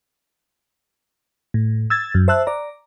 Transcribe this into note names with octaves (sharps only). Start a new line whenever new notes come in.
A2
E6 G#6 A6
F#2
C5 E5 A5 E6 F#6
D5 A#5